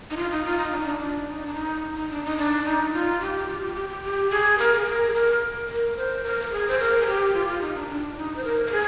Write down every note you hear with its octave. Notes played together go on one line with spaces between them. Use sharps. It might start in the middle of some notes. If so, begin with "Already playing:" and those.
D#4
F4
D#4
F4
D#4
D4
D#4
D4
D4
D#4
D4
D#4
D#4
D4
D#4
D4
D#4
F4
G4
F4
G4
G4
G4
G4
G#4
A#4
G#4
A#4
G#4
A#4
A#4
C5
A#4
A#4
G#4
C5
A#4
G#4
G4
F4
F4
D#4
D4
D4
D#4
C5
A#4
A#4
G#4